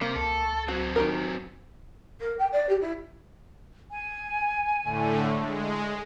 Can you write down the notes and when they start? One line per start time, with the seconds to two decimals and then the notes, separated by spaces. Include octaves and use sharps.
0.01 C3 A#3 A#5
0.16 C#2 A4
0.68 F#3 C4 F#4
0.96 D#3 G4 A#4
2.21 A#4
2.38 G5
2.52 D5
2.69 G4
2.81 E4
3.91 G#5
4.83 A2 D3 A3
5.37 G#3